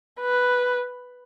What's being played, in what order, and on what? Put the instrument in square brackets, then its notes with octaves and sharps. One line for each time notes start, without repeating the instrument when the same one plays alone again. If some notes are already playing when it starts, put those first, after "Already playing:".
[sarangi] B4